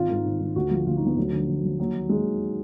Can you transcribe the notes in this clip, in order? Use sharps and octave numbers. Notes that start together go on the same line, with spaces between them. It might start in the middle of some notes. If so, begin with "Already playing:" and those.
Already playing: G#1 F4
G#2 D#3
G#1
G#2 D#3
D2 F#4
D3 F3 F4
D2 F4
D#4
D3 F3 B3
D2 F#3
D3 F3
D2
D3 F3
D#2 F#3
D#3
D#2 G#3
D#3